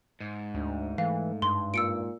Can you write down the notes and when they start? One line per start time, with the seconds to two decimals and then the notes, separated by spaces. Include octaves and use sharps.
0.20 G#2
0.54 D2 D4
0.98 E3 A3 F5
1.42 G2 C6
1.74 A#2 E6 C#7 D7